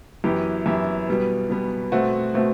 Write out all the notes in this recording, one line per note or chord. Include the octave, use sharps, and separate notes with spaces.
F#2 E3 B3 E4 G4
F#2 E3 B3 E4 G4
B2 G3 B3
B2 G3 B3
B2 A3 C4 F#4
B2 A3 C4 F#4